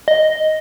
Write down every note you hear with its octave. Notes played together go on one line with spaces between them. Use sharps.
D#5